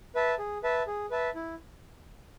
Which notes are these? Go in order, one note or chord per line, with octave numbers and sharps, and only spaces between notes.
B4 E5 A5
G#4
B4 E5 A5
G#4
B4 E5 A5
E4